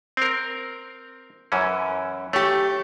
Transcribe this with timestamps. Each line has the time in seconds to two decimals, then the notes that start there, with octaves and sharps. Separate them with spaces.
0.17 C4 A#4
1.52 F#2 E3 C#4
2.33 A3 G4 C#5